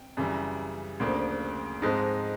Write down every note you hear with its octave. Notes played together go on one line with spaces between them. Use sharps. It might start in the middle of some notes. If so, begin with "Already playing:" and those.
Already playing: G5
F#2 C#3 E3 G3
D2 C#3 F3 A#3 D4
G#2 F3 G#3 C4 D#4 A5